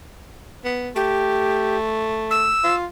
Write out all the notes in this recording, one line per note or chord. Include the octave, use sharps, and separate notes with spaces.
B3
A3 G4
E6
F4